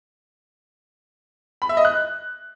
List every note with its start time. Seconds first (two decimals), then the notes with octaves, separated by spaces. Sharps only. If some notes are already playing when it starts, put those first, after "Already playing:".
1.62 B5
1.69 E5
1.77 D#5
1.85 F#6